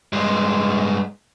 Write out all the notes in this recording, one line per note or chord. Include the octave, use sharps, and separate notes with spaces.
G2 G#3